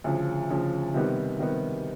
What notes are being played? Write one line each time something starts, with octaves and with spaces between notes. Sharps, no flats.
D2 C#3 F3
D2 C#3 F3
C3 D#3 G3 B3
C3 D#3 G3 B3